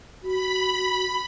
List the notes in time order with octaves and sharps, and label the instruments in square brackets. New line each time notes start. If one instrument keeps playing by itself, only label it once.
[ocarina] F#4 [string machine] B5